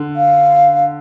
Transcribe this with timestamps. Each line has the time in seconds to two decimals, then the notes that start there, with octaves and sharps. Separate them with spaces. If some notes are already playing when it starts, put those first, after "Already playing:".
Already playing: D3
0.16 F5